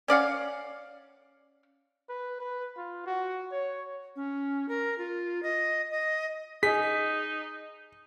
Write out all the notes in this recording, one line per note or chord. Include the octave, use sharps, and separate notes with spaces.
C#4 D5 F5 F#5
B4
B4
F4
F#4
C#5
C#4
A#4
F4
D#5
D#5
D#4 G#4 D#5 B6